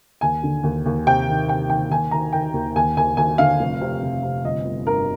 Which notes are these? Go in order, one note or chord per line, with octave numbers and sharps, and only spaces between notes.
D#2 G#5
D3
D#2
D#2
C3 G5
D#3
C3 G5
D#3 G5
D#2 G#5
D#3 A#5
D#3 G5
D#2
D#2 G#5
D#2 G#5
D#2 G#5
D3 F5
F1
C3
F1
C3
G1 D#5
G1
G2 A#4